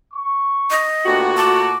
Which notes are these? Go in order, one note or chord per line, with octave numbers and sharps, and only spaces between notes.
C#6
D#5
A#2 A3 B3 D4 F#4 G4
A5 D6